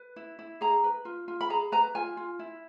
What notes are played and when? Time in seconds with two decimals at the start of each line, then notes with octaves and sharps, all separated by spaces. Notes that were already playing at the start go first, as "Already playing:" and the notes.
Already playing: B4
0.16 E4
0.39 E4
0.61 G#4 A#5
0.84 B4
1.05 F4
1.28 F4
1.41 B5
1.50 G#4 A#5
1.72 B4 A#5
1.95 F4 G#5
2.17 F4
2.39 E4